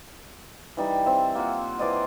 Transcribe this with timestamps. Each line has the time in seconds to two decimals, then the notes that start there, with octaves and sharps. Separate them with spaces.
0.77 E3 G3 D#4
1.06 C4 E5
1.35 A#3 F4 F#5
1.79 E3 C5 D5 D#5